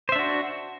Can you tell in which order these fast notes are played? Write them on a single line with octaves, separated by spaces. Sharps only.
C5 E5 D4 F#4